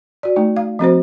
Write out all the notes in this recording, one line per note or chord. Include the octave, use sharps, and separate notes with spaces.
F#4 D5
A3 D#4
F5
F3 C4 F#4 C5